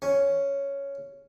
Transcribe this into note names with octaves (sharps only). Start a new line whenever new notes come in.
C#4